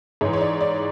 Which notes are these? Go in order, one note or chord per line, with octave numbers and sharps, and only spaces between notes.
G#2 E3 C#5
C#5
D5
D5